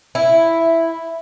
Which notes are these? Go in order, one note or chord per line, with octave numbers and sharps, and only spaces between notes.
E4